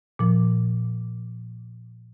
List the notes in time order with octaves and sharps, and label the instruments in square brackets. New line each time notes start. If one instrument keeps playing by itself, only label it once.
[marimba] A#2 F3